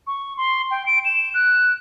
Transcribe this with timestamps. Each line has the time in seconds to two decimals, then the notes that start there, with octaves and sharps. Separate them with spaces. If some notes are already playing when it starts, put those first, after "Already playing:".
0.07 C#6
0.37 C6
0.71 G5
0.86 D7
1.05 E7
1.34 F#6